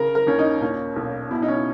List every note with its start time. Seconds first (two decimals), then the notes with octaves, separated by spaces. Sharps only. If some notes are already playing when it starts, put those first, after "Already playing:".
Already playing: C#3 A#4
0.15 A#4
0.27 D#2 C#4
0.39 D#4
0.61 A#2 C#4
0.96 B1
1.31 B2 E4
1.42 D#4
1.48 C#4